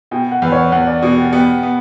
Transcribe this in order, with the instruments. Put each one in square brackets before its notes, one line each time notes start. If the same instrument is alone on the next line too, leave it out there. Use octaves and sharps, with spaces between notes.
[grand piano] B2 [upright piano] G5
[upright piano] F#5
[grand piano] E2 [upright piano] B4
[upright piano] C#5
[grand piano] E2 [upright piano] F#5
[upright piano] D5
[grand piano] B2 [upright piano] F#4
[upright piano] G4
[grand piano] B3 [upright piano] G4
[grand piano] B3